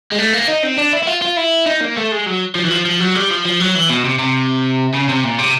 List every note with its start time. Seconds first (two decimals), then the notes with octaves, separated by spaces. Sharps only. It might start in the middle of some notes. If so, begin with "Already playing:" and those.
0.12 G#3
0.18 A3
0.33 A#3
0.48 D#4
0.63 C4
0.78 D4
0.93 E4
1.03 E4
1.07 F4
1.22 F4
1.37 E4
1.66 D#4
1.81 A#3
1.97 A3
2.11 G#3
2.26 F#3
2.55 F3
2.65 E3
2.71 F3
2.86 F3
3.00 F#3
3.15 G3
3.30 F3
3.45 F3
3.60 F#3
3.75 E3
3.90 B2
4.05 C3
4.19 C3
4.94 C#3
5.08 C3
5.24 A#2
5.38 C3